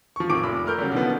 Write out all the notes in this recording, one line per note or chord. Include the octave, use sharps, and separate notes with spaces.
F3 C#6
A1 D#3 F3 C4 D6 D7
F1 B5 E6
A3 A#4 F6 G6
C#3 F#3 G3
B2 D3 D#3 F3 B3